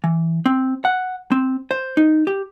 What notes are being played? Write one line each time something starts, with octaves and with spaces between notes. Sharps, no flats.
E3
C4
F#5
C4
C5
D#4
G4